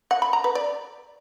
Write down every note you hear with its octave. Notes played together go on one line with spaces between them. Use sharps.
F#5
B5
A#5
B4
D5